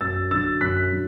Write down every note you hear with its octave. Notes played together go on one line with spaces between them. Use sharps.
F#2 E6 A6
D3 F#3 E6 A6
F#2 F#6 B6
D3 F#3